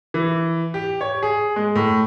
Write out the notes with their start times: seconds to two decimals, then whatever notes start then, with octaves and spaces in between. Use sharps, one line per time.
0.14 E3
0.74 G4
1.01 C#5
1.23 G#4
1.56 G#3
1.76 A2